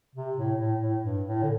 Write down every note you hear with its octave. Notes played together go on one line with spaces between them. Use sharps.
C3
A2
A2
A2
G2
A2
D3